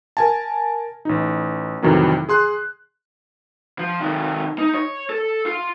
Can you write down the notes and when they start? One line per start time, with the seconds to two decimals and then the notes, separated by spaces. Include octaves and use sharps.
0.17 A#4 G#5 A5
1.05 A1 D#4
1.82 F2 A2 C3 D#3 E3 F#3
2.29 G#4 C6 F#6
3.79 F3
4.00 C3 D#3
4.59 D#4
4.74 C#5
5.10 A4
5.46 F4